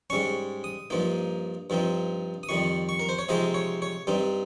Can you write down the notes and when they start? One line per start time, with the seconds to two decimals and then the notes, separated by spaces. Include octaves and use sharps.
0.10 G#2 G3 C#4 C#6
0.64 D#6
0.90 G2 F3 A#3 D#4
1.70 G2 F3 C4 D#4
2.43 D#6
2.49 F2 D#3 G3 C#6
2.89 C#6
2.99 A#4
3.09 C5
3.19 C#5
3.29 C3 F3 G#3 C4 D#4 D#5
3.54 C#5
3.82 C#5
4.07 G2 G3 C4 D#4